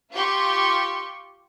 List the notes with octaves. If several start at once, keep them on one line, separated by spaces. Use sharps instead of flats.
F4 G4 C6 C#6